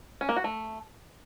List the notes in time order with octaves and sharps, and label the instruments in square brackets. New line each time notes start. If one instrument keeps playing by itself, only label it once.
[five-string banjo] C#4
A#3
F#4
A3